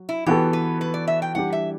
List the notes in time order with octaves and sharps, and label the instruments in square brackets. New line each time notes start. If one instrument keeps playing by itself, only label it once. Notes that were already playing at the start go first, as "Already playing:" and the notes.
Already playing: [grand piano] F#3 F#4
[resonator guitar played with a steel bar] E4
[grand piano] E3 B3 F#4 A4 [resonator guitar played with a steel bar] G4
[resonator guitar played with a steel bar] B4
B4
D5
E5
G5
[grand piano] E3 G3 D4 G4 [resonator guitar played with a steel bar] F#5
[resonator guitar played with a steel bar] E5